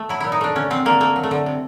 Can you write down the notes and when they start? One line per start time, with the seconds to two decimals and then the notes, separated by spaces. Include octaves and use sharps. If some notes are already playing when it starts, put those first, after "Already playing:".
Already playing: A3
0.09 F#3 E4
0.20 A#2 E4
0.32 D#4
0.41 A3 D4
0.55 D3 C#4
0.70 F#3 C4
0.85 D3 A#3
1.00 A3 A#3
1.16 F#3
1.23 A3
1.31 D3
1.46 C3